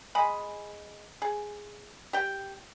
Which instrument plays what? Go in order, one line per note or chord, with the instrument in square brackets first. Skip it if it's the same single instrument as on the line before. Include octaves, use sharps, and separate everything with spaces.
[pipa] G#3 G#4 B5
G#4
G4 G5